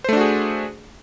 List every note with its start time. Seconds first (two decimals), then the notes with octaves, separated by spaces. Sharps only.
0.04 C5
0.09 A3
0.13 D4
0.17 F#4
0.21 G#4